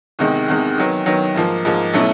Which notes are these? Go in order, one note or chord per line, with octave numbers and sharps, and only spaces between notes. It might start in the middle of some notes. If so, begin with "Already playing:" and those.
E2 C3 D#3 G#3
E2 C3 D#3 G#3
D#3 F#3 B3
D#3 F#3 B3
G#2 F3 A#3
G#2 F3 A#3
B2 F#3 A3 C#4 E4